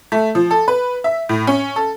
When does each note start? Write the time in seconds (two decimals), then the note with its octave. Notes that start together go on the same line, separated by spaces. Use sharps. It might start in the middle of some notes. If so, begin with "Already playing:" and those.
0.12 A3
0.35 F3
0.51 A4
0.68 B4
1.04 E5
1.29 A2
1.47 C#4
1.76 A4